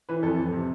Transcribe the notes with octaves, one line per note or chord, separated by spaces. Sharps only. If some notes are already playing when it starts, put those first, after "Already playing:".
E3 B4
F2 A4
F2
C3